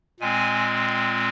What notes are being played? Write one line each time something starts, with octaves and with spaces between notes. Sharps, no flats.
A#2 G#3 C4 G#5